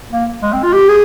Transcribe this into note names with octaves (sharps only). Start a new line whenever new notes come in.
A#3
G#3
C4
F4
G4
G#4